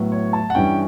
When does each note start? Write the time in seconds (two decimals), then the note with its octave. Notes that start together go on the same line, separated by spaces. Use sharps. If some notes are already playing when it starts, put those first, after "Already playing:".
Already playing: A2 F#3 B3
0.12 C#5
0.33 A5
0.50 F#5
0.55 G2 E3 G3 C#4 G5